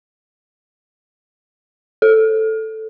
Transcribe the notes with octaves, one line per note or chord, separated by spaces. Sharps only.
A4